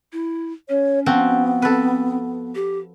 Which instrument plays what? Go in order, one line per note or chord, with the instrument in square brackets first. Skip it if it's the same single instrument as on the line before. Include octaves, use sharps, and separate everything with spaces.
[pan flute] E4
[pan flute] C#4 [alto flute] C#5
[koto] F3 C4 F#4 [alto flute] B3
[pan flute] C4 [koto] A4 B4
[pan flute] G4